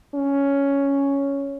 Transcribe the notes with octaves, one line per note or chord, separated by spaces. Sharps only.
C#4